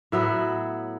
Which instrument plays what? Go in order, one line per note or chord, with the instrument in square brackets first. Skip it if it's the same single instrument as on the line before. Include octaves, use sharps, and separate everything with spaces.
[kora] A2 F#3 B3 E5